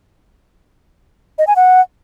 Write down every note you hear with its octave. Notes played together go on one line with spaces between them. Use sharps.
D#5
G#5
F#5